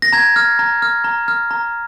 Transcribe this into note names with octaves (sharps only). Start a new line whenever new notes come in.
A#6
A#5 G#6
F6
A#5
F6
A#5
F6
A#5